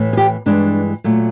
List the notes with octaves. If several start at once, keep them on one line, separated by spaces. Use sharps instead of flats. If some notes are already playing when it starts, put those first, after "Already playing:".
Already playing: A2 E3 A3
G#4
G4
G2 E3 G#3 D4
A#2 F#3 A3